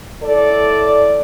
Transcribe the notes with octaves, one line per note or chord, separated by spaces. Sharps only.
A2 A4 D5